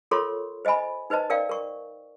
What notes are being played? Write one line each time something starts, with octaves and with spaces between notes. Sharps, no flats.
F4 A4 A#4 C#5 C6 C#6
C5 D#5 E5 G#5 B5
D#4 B4 C5 D#5 A5
A#4 D5 F5 G5
A#4 C#6